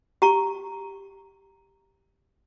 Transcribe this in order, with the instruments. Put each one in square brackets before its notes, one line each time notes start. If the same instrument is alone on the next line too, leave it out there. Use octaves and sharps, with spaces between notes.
[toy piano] G4 A#5 C#6